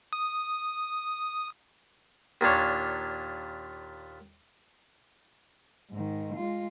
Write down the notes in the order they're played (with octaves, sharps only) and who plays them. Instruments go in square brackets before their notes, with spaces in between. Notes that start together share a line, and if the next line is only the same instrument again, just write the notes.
[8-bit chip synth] D#6
[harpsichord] D#2 A#2 D4 C#5
[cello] G#2 D#3
G#3 F4